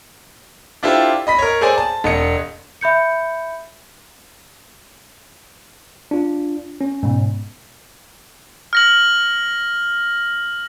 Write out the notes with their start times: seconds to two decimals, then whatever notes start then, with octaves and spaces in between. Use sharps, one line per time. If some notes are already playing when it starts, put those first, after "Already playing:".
0.83 D4 E4 F4 G4 A4 C5
1.27 D#5 B5 B6
1.39 A#4 C#5
1.61 G#4 A4 C5 D5 G#5
1.78 A5
2.04 E1 D#5 C#7
2.81 E5 B5 G6 C#7
6.11 D4 F4
6.81 C#4
7.03 G#2 B2
8.73 F6 A#6 F#7